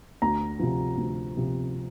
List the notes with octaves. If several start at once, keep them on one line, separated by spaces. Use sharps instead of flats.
D2 A#5
C3 F3
D2
C3 F3